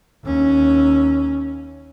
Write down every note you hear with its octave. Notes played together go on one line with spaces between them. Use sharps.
D#2 C#4